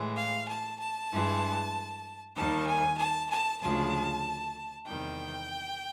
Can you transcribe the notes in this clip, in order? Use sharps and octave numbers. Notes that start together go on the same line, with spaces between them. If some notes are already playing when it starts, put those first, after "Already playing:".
Already playing: A2 E3 G#3
F5
A5
A5
G2 E3 G#3
D#2 D#3 G3 A5
G#5
A5
A5
D2 C#3 F3 G#3 A5
E2 C3 D#3 G3 G5